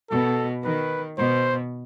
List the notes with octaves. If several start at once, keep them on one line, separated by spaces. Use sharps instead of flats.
B2 A4
D#3 B4
B2 C5